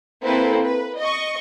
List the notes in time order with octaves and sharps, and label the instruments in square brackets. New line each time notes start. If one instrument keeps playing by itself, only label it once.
[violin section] A#3 C4 E4 A4 B4
B4
D#5 C#6